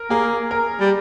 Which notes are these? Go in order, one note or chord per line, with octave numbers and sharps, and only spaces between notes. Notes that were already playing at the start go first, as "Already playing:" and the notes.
Already playing: A#4
A#3 G#4
A#4
G3